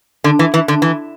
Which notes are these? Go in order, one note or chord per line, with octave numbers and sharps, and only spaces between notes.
D3
E3
E3
D3
E3